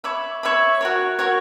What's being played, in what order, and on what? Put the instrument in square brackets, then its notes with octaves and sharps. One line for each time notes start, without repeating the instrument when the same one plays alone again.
[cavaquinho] C#5 E5 B5 D6
C#5 E5 B5 D6
F#4 A#4 C#5
F#4 A#4 C#5